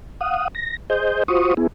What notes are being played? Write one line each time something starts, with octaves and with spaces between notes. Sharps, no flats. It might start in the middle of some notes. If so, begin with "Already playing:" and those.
F5 F#5 D#6
A#6
G#4 C5 D#5 G6
F4 F#4 C5 C#6 D#6
B3 E4 G#4